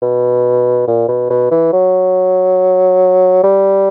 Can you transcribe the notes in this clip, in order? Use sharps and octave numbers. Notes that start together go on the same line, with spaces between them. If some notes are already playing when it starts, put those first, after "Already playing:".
B2
A#2
B2
B2
E3
F#3
G3